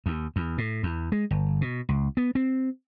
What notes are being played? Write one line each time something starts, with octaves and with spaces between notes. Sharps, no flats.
D#2
E2
A2
E2
G#3
G1
B2
C#2
B3
C4